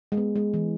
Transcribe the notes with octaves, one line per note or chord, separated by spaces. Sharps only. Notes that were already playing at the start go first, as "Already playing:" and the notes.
G#3
B3
G#3
E3